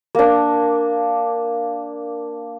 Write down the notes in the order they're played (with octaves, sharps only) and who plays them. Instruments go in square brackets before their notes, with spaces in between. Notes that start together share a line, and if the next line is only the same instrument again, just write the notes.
[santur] A#3 D4